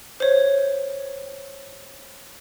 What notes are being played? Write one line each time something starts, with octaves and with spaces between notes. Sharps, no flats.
C5 C#5